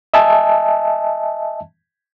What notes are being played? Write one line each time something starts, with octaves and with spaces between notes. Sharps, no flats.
D#5 E5 G#5 A5